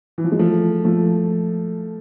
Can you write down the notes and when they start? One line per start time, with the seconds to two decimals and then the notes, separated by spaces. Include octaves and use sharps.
0.18 E3
0.24 F3
0.32 G#3
0.39 F3 A3
0.85 F3 A3